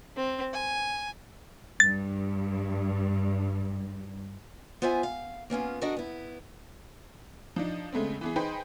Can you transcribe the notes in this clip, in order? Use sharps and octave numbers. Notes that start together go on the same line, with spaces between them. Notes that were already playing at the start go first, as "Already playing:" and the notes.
C4
G#5
G2 A6
B3 F4 C5 E5 G#5
F5
A#3 B3 C#4 F4
D4 F#4 A4 A#4 D#5
B3 E4
F3 D4 D#4
C#3 G#3 A3 B3 C4
E3 B3 G#4
D#4 G#4 B4 C5 G5 B5